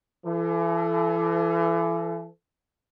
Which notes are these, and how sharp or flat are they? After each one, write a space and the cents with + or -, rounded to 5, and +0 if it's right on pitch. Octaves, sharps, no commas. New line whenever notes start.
E3 +35 A4 -15